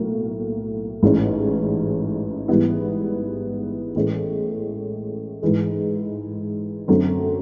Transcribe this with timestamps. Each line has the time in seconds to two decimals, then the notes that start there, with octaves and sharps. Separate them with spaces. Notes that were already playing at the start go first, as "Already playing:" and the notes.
Already playing: B1 A2 A#3
1.03 A1 G#2 E3 G#3 C#4
2.48 G#2 E3 G3 B3 E4
3.96 A2 E3 G#3 C#4
5.42 G#2 E3 G#3
6.88 F#2 D3 F#3 A3 C4